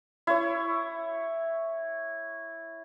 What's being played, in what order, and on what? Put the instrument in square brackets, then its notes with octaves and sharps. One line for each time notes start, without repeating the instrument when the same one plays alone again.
[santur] E4 C#5